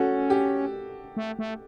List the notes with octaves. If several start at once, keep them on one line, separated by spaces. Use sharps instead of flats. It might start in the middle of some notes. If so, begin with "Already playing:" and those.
Already playing: C#4 F#4 A4
G4
A3
A3